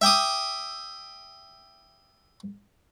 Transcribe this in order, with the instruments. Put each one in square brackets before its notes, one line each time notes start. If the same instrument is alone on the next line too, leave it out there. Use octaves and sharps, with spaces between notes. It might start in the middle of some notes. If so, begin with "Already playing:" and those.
[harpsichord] E5 G5 D6 D#6